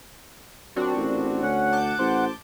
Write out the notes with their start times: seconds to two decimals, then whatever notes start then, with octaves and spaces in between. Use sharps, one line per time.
0.76 A#2 F#3 C4 D4 F#4
0.96 A1
1.43 D2 C#4 F#5
1.73 A5 D6 G6
1.99 A1 C5